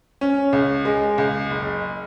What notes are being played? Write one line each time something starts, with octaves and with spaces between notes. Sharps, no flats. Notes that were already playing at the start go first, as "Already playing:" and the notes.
C#4
C#2
G#3
C#2
F#1